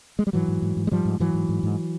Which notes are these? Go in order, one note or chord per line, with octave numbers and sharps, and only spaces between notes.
G#3
G3
G#2 E3 F#3
G#2
G#2
G#2
G#3
G#2 F3 G3
G#2
G#2 E3 F#3
G#2
G#2
G#2